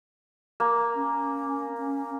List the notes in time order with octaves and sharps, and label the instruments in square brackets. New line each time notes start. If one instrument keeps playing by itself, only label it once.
[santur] A#3
[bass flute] C#4
C#4